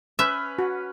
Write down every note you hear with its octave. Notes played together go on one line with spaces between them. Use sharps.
C#4 B4 E5
F#4